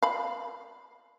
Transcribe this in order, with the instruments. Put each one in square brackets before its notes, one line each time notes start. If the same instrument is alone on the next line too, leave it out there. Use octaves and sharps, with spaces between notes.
[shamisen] F5 B5